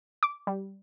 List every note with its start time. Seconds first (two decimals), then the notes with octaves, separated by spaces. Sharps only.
0.23 D6
0.47 G3